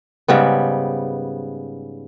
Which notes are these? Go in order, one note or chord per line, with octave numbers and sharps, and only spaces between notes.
G#2 C#3 G3 B3